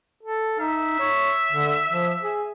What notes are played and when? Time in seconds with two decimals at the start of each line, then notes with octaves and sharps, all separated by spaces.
0.23 A4
0.60 D#4 E5
1.00 C#5
1.52 D3
1.90 F3
2.22 G#4